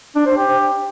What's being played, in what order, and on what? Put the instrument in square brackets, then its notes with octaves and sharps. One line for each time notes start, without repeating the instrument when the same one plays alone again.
[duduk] D4
C5
G4